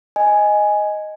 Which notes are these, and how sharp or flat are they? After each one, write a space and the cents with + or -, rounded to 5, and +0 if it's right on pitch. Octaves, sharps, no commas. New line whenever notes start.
D#5 +0 G#5 +0